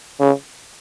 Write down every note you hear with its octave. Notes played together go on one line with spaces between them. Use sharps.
C#3